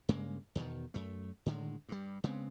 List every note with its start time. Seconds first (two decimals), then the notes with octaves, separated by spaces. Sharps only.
0.09 G2 C#3 G#3 A#3
0.55 E2 B2 D3 D#3
0.94 F#2 A3
1.46 A2 D3 D#3 G#3
1.89 G2 G3
2.24 C#3 G#3 B3 C4